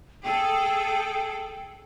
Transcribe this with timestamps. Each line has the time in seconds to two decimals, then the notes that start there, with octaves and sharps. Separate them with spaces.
0.24 G#4 A4 G5